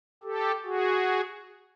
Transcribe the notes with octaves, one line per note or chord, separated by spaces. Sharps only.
G4 A4
F#4 G#4